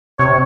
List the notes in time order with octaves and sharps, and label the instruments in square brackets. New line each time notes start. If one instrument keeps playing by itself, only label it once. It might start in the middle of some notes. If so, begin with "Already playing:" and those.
[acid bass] C3 [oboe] C#5